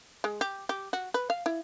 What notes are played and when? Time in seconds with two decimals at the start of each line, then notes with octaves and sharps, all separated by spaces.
0.24 G#3
0.41 G4
0.69 G4
0.93 F#4
1.14 B4
1.30 F5
1.46 E4